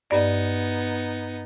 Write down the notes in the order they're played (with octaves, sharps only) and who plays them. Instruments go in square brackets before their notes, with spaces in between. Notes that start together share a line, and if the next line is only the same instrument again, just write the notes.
[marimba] G2 D5 [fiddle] B3 D#4